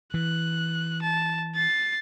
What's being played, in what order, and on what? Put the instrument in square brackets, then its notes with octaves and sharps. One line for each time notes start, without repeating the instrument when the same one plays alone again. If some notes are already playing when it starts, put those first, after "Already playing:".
[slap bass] E3 [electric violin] F#6
[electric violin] A5
A6 C7